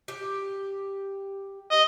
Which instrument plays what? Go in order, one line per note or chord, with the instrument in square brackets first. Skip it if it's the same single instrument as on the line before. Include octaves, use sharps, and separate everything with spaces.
[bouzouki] G4
[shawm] D#5